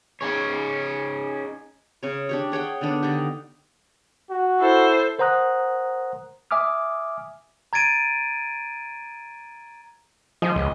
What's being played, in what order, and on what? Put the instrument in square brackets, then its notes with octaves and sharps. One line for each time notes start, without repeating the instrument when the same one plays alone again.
[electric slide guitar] C#4 D#4 G#4 C#5
[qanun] C#3 C#5
D4 G4 C#5
G#4 C#5 F#5 G5
D3 D#3 B3 D4
D3 D#4 G4
[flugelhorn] F#4
[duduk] E4 [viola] A4 C5
[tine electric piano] A#4 C5 F#5 A#5 D#6 F#6
E5 G#5 D6 D#6 F6
[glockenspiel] A#5 G#6 A6 D7 D#7
[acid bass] F3 [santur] D#5 G#5
[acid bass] C#2